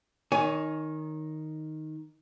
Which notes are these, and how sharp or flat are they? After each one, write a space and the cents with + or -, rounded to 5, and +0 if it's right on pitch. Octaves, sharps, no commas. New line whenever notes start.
D#3 +0 C#5 +25 G#5 +0